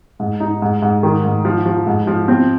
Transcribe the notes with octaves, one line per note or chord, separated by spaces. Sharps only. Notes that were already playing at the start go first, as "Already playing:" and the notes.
G#2
D#4
G#2
G#2
D#3
G#2
F3
F3
G#2
F3
C4